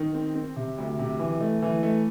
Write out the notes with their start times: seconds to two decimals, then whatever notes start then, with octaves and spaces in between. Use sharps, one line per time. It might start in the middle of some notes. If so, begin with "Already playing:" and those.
Already playing: D#3
0.14 C4
0.35 C4
0.56 C3
0.78 D2
0.99 C3
1.19 E3
1.41 A3
1.62 E3
1.83 A3